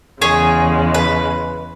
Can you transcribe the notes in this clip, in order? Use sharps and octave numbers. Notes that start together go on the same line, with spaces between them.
E2 C#3 G#3 G#4 C#5
B4